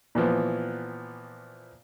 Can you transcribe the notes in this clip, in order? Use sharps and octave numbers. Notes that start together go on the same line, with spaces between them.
A#2 E3 F3 B3